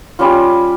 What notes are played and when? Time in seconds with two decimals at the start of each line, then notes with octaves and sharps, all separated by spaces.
0.19 G3 C#4 F4